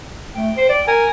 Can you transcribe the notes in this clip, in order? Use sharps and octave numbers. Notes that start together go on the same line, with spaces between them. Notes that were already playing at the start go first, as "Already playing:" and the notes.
A3 G5
C5
D5
A#4 G#5